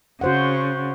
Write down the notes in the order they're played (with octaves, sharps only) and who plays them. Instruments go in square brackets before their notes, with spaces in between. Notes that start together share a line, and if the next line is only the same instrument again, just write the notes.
[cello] C#3 [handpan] F#4 C5 F#5